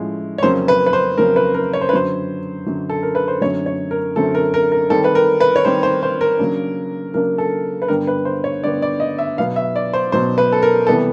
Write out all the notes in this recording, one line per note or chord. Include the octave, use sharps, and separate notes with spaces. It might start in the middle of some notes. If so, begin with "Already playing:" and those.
Already playing: A2 F3 G#3 C#4 E4
C#5
F2 C#3 F#3 A#3 C#4 C5
B4
B4
C5
F2 C#3 F#3 A#3 C#4 A#4
B4
A#4
C#5
C5
B4
F#2 D3 F#3 C5
F#2 D3 F#3
A4
A#4
B4
C5
F#2 D3 F#3 A3 C4 C#5
C#5
A#4
F#2 D3 F#3 A3 C4 A4
A#4
A#4
A#4
D#3 G3 C4 A4
B4
A#4
B4
C#5
D#3 G3 C4 C5
C5
C5
A#4
C#3 F#3 A#3 D4
C#3 F#3 A#3 D4 A#4
A4
B4
G2 D3 G3 B3 A#4
B4
C5
C#5
G2 D3 G3 B3 D5
D5
D#5
E5
B2 F#3 B3 F5
E5
D5
C5
B2 F#3 B3 C5
B4
A4
A#4
C3 E3 G3 B3 E4 A4